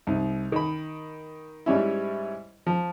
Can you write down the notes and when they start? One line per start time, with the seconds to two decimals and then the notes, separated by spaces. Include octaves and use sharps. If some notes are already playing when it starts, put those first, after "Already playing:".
0.07 C2 D#4
0.52 D#3 B5
1.66 G#2 G3 C#4 E4
2.66 F3